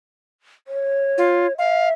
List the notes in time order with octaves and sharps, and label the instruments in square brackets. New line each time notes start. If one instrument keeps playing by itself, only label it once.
[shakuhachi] C#5
[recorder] F4
[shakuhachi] E5 [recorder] F5